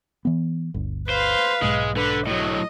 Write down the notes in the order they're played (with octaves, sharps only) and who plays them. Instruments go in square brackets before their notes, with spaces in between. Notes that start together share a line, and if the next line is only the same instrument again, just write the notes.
[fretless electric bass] E3 B3
G1 D2
[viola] B4 F5 [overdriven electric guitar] C5
[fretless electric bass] B1 G#2 [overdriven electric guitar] G#3
[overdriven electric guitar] D3 [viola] B4
[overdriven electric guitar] A2 F#3 [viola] D#5